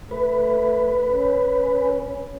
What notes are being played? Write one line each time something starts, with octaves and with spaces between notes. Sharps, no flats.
A3 B4
C#4